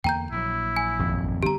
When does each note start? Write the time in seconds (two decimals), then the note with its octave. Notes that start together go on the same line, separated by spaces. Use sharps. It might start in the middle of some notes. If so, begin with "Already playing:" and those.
0.04 E2 D3 A#3 G5 A#5 G6
0.32 A#1 F#3 E4
0.76 G#5
0.99 G#1 F2
1.43 D3 G3 B3 G4 A#5